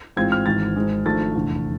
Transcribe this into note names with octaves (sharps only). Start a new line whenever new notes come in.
A1 G#2 G#3 C4 F4 G#6
F6
G#1 G#2 E3 A6
G#1 G#2 G#3
G#1 G#2 F3 A3 D4 A6
F1 E2 D3 A3